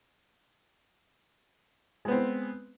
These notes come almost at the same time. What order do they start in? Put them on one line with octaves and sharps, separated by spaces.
G#3 B3 C4